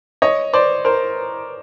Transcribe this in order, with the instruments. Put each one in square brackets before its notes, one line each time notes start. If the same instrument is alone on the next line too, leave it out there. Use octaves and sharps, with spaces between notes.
[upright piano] C#5 D#5
C5 D5
A#4 C5